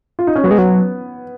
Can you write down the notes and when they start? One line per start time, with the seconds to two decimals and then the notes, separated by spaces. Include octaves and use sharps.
0.19 F4
0.27 D#4
0.36 C#4
0.44 F#3 B3
0.51 G#3
0.58 F#3